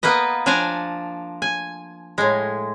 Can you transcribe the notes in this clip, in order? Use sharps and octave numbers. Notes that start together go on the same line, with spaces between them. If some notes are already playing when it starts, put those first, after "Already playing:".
A#3 B3 B4 D#5
F3 D4 D5 G#5 A#5
G#5
A2 G#3